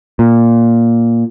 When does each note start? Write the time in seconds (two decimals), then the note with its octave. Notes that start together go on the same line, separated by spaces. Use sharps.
0.19 A#2